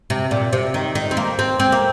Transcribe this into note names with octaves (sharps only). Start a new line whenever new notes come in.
C3
A#2
C3
D#3
D#3
C4
A#3
C4
C4
A#3